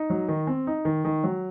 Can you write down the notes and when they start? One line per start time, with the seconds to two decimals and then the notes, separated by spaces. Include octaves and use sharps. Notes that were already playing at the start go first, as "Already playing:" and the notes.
Already playing: D#4
0.10 F#3
0.29 D#3
0.47 C4
0.67 D#4
0.85 D#3
1.05 D#3
1.24 F#3